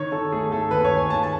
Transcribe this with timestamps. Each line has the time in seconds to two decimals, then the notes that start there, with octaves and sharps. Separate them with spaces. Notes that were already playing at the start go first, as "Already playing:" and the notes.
Already playing: D#3 C#5
0.12 D#3 A4
0.32 A3 G#4
0.52 D#3 A4
0.71 D#2 B4
0.84 C#5
0.91 D#2
0.97 G#5
1.10 D#3 A5
1.23 A5